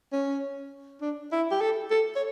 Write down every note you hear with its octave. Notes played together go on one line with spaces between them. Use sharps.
C#4
D4
E4
G4
A4
A4
C#5